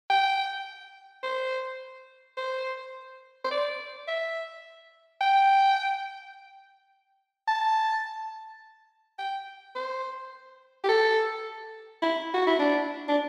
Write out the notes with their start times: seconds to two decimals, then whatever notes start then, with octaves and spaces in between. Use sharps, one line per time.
0.10 G5
1.23 C5
2.37 C5
3.45 C5
3.51 D5
4.08 E5
5.21 G5
7.48 A5
9.19 G5
9.76 C5
10.84 G4
10.89 A4
12.02 E4
12.34 F#4
12.47 E4
12.59 D4
13.08 D4